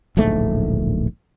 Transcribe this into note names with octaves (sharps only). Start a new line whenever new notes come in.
D1 A#1 G#2 A3